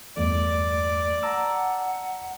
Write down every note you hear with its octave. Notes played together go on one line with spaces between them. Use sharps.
E2 G2 A3 D5
F#5 A5 A#5 E6